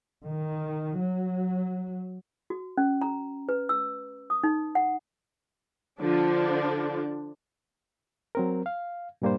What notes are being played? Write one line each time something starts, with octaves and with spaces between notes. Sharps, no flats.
D#3
F#3
F#4
C#4
A#5
B4
E6
D#6
D#4
F#5
D3 F3 D4
F#3 C4 A#4
F5
G2 A#2 G3 A#3 D4 C5